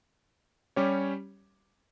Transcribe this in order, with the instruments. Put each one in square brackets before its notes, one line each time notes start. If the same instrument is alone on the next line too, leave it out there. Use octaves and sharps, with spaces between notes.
[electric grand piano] G3 C#4 G4 C#5